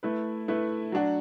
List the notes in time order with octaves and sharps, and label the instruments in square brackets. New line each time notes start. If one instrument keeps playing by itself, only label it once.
[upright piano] A3 E4 B4
A3 E4 B4
F#3 D4 F#4